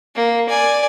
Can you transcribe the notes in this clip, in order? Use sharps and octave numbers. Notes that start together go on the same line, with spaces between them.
A#3
D5 G#5